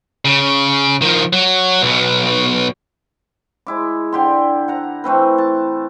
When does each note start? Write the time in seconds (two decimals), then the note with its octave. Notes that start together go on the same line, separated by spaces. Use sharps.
0.25 C#3
1.02 D#3 F3
1.33 F#3
1.81 B1 B2
3.67 G#3 E4 D6
4.13 D3 G4 C6
4.68 F#5 A#5
5.04 E3 A3 C4 B4
5.38 A5